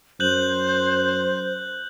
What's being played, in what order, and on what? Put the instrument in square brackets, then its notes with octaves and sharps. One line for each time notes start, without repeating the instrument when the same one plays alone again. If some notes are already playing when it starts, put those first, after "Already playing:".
[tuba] F#2 [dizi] C5 [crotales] F#6 G6 F#7